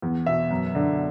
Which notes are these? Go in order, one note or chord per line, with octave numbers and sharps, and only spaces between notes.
E2
B2 E5
F#2
D3